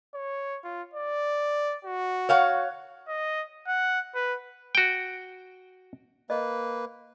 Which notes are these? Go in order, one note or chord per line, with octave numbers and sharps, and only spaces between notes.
C#5
F4
D5
F#4
C#5 F5 F#5
D#5
F#5
B4
F#4 G5
A#3 B4 D#5